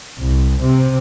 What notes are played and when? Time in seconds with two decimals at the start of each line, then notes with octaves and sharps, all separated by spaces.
0.20 C2
0.61 C3